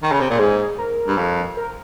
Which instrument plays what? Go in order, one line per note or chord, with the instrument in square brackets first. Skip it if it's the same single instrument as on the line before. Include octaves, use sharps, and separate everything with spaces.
[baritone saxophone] D#3
C#3
C3
A#2
[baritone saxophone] G#2 [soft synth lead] G#4
[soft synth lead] A#4
[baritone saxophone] G2
F2
[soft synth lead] A#4